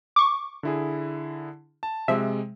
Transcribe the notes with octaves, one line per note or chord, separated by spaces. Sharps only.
C#6 D6
D3 E4 G#4
A5
C3 F3 G#3 E5